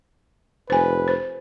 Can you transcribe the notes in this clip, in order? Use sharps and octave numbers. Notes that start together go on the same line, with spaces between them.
F1 B4 C5 G#5
C5